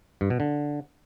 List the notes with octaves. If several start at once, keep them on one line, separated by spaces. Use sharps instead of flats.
G2
B2
D3